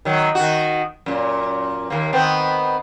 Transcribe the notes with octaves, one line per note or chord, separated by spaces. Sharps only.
D#3 F#3
D#3 F#4
F#2 A#2
D#2 A#3
D#3 B3 C4